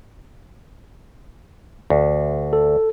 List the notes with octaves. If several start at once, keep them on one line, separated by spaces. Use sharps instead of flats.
D2
A4